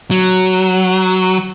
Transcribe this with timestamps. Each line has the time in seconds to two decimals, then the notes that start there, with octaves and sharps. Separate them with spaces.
0.11 F#3